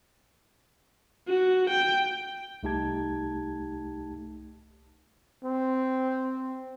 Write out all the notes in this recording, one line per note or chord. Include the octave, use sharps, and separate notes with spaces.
F#4
G5
C2 A3 D#4 G4 A5 G#6
C4